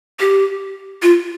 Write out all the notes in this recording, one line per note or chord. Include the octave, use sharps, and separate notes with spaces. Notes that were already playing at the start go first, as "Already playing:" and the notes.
G4
F4